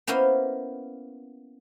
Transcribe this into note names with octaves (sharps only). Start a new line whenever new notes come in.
A#3 B3 C#4 E4 C5 F5